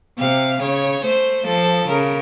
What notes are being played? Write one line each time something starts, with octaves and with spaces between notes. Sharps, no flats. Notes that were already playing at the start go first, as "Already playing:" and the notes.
C3 F5
C#3 C#5
A3 C5
F3 A4
C#3 A#4